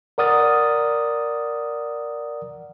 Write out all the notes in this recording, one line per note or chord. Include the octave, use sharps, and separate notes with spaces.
A#4 D5 F#5 D#6 F6 A6